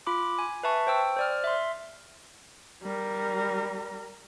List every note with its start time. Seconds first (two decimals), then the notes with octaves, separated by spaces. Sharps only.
0.07 F4 B5 D6
0.39 G#5
0.63 B4 E5 A5 C#6
0.87 C5 G5 E6
1.17 C5 D5 F6
1.44 E5 C6
2.83 G3 A#4